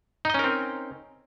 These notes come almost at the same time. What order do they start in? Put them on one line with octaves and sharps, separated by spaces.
D#4 D#5 C#4 A#4 C4